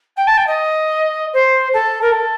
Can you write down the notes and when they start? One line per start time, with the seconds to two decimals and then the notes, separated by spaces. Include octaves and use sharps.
0.16 G5
0.27 A5
0.37 G5
0.46 D#5
1.33 C5
1.73 A4
2.01 A#4
2.11 A4